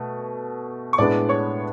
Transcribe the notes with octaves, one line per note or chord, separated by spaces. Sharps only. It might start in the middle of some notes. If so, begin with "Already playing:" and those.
Already playing: B2 A3
C#6
A2 G#3 B3 D4 D5 D6
C#5 C#6